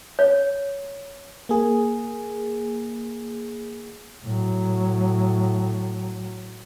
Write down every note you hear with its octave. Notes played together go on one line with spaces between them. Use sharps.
C#5
A#3 G#4
A2 F#3